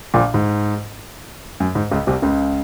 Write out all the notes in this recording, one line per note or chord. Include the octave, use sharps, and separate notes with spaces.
A#1 A#2
G#2
F#2
G#2
C#2 C#3
C2 C3
C#2 C#3